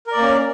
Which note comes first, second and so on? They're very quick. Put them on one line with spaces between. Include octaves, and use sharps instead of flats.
A#4 D5 A#3 C#4